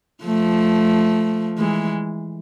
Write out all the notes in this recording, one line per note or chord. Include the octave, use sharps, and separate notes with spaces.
F3 A3
E3 G#3